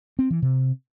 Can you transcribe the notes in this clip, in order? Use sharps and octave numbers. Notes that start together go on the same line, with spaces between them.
C4
E3
C3